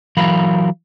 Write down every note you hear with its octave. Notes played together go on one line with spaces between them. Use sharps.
E3 F#3 A#4 F5 B5